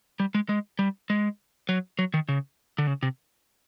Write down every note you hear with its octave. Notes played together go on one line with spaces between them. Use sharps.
G3
G#3
G#3
G3
G#3
F#3
F#3
D#3
C#3
D3
C#3
C3